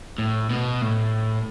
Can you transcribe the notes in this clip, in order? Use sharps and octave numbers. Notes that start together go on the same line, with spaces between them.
A2
B2
A2